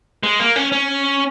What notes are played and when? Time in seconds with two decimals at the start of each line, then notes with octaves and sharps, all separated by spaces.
0.23 G#3
0.40 A#3
0.56 C#4
0.72 C#4